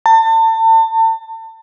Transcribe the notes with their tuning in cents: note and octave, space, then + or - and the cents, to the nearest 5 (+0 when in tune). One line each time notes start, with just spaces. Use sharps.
A5 +35